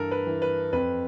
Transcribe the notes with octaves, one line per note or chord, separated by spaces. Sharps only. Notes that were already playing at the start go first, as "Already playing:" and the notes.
Already playing: G2 E3 A4 A#4
B4
E3
B4
F2 B4